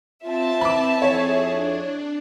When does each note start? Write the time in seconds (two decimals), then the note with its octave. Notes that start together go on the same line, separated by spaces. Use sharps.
0.24 C4 F4 E5 A5
0.61 E3 B5 D6
1.02 F2 E4 G#4 C#5 G#5
1.47 D4